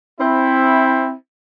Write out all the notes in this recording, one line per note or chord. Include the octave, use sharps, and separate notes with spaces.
C4 E4